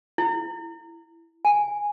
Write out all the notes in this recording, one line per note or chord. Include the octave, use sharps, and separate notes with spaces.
E4
G#5